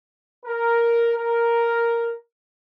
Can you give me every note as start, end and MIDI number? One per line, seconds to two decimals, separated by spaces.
0.46 1.13 70
1.17 2.15 70